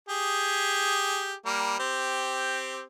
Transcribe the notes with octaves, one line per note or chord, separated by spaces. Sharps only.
G4 G#4
G3 A#3
C4 G4